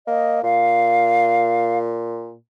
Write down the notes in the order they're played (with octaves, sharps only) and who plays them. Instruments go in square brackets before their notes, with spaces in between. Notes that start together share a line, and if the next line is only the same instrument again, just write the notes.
[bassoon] A#3 [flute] D#5
[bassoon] A#2 [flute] F5